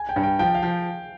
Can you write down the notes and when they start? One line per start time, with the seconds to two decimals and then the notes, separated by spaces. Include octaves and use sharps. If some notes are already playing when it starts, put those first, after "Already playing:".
Already playing: G#5
0.09 G5
0.16 G2
0.23 G5
0.39 F3 G5
0.55 F5
0.63 F3